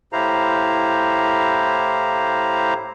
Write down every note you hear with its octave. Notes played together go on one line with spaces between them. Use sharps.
A2 E4 G4 C5 F5 A#5